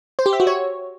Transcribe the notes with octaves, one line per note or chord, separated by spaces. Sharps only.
C5
G4
E5
F#4
C#5